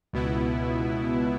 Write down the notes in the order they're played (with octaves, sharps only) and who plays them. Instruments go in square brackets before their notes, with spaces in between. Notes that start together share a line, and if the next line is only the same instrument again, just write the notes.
[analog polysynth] C#2 B2 B3 E4